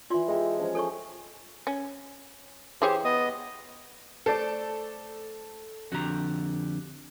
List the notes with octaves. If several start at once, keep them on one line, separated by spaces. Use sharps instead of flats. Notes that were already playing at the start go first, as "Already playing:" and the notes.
E3 F4 D5 A#5 C6
G#3 G4 A4 D6
F3 C#4 C#5
G#4 A4 C#5 D#5 C#6
C#4
E3 G4 G#4 C5 C#5
B3 D#5 D#6
A3 A4 C5 D5
F2 D3 F#4 G4 A#5